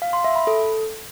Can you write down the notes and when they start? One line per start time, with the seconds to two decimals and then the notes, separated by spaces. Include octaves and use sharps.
0.02 F5
0.13 C6
0.24 E5
0.36 B5
0.47 A4